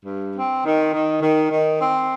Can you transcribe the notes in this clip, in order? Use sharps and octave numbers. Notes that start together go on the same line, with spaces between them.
G2
C4
D#3
D#3
D#3
D#3
C4